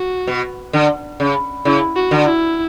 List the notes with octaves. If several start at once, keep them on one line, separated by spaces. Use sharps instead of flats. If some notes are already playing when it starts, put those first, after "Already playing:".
Already playing: F#4
B2
D3
C#3
C#3 E4
F#4
D3
E4